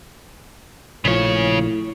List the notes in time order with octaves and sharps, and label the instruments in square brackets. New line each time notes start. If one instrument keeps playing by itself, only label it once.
[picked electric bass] A#1 F3 [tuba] A2 [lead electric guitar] C#3 C#5